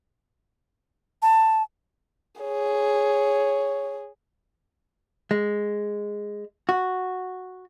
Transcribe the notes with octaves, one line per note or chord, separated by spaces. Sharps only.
A5
G#4 C#5
G#3
F#4